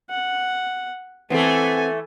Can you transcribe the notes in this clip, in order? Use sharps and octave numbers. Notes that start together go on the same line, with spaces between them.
F#5
E3 A3 B3 C4 A4 G#5